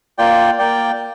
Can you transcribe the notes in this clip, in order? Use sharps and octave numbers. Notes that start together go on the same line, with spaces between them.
A#3 F4 D5 G5
A#3 D5 G5